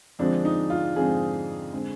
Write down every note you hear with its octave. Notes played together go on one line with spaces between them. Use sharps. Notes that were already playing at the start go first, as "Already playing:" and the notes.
F2 D3 F3 G#3 C4 D4
D#4
F4
F2 D3 F3 G#3 C4 G#4
D3 G#3 C4